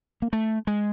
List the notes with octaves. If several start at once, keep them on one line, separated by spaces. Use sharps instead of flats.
A#3
A3
G#3